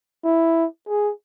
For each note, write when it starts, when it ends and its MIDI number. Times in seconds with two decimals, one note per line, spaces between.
0.24 0.66 64
0.88 1.11 68